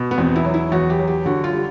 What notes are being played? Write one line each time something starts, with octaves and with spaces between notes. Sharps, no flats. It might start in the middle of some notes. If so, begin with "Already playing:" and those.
Already playing: B2
B3
E2 C4
E4
F#3
E4
E2 F#4
G4
F#3
G4
D3 F#4
F4
G3